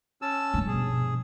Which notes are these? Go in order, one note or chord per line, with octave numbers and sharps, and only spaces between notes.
C#4 A5 E6
G2 F3
B2 G#4